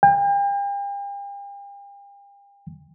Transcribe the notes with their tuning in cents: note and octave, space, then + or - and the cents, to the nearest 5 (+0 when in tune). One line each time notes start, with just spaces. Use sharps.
G5 +40